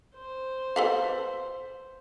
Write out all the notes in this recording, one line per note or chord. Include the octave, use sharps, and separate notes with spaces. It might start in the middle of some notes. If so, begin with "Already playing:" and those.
C5
A4 B4 F5